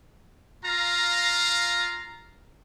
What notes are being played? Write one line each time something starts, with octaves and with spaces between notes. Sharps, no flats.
F4 F5 A#5